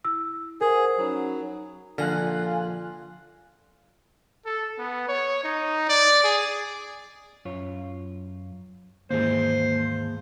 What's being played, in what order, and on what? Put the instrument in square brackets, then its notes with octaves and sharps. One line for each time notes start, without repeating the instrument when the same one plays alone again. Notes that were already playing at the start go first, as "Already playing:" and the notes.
[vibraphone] E4 [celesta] E6
[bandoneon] G#4 [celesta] A#4 [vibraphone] C5 F#5
[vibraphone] C5
[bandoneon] F#3 [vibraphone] C#4 D#4 B5
[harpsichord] A#1 A#5 [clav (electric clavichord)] D3 [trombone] F4 [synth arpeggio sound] F5 G#5 F#6
[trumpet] A4
B3
C#5
D#4
D5
G#4
[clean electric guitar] F#2 F4 C#5
[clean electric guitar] D#2 G#2 E3 [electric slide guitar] A#3 G#4 [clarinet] C5